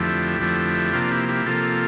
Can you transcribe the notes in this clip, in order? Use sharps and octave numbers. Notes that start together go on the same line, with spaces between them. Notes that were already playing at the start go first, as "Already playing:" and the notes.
Already playing: F2 D3 F3 A3 E4 G4
F2 D3 F3 A3
C3 F3 A#3 D4 F4
E4 G4
E4 G4
C3 F3 A#3 F4 A4